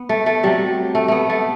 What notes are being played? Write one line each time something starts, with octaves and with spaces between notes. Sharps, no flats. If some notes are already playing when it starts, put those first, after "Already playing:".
Already playing: B3
A3
A3
C3 F#3 G3
A3
A3 B3
A3